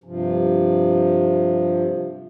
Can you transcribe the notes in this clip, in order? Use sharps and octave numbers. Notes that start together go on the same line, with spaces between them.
G2 C3 F3